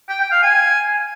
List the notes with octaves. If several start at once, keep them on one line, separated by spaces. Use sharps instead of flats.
G5
G5
F5
G#5